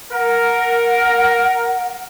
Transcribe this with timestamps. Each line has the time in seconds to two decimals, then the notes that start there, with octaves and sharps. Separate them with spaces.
0.12 A#4 F#5